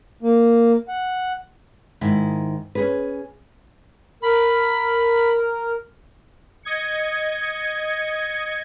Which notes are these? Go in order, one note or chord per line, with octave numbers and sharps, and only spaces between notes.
A#3
F#5
G#2 D#3 E4
C#4 G#4 B4
A#4 B5
D#5 G#6 C#7